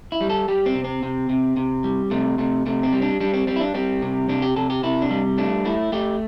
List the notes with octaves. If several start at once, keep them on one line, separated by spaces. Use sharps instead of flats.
E4
G3
A4
G3 G4
C4
C3
C4
C3
C3
C3
G3
C3 A3
C3 A3
C3 A3
C4
G3
D4
G3 D4
C4
G3 C4
E4
D4
G3 C4
C3
C3 D4
G4
C3 A4
G4
C3 E4
D4
G3
A3 D4
A3 E4
A3 G4